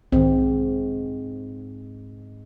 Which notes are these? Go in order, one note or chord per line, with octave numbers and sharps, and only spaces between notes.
B1 G#2 D#3 C4